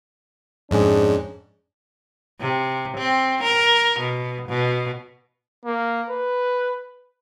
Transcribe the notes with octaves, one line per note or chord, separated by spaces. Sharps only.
F2 G#2 C#4 D4 G#4
C3
C4
A#4
B2
B2
A#3
B4